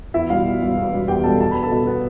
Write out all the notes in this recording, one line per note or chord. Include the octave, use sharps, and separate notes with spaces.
E2 E4 E5
B2 G3 F4 F5
E2
B2 G3
E2
B2 G3
E2 G4 G5
B2 G3 A4 A5
B2 A5
B3 B5
A4 A5
B2
B3